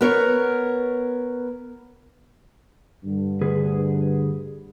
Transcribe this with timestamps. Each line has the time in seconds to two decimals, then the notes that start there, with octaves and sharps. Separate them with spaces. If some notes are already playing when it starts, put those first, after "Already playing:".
0.01 B3 A#4 C#5
3.04 G2 D3
3.41 D2 G#4 B4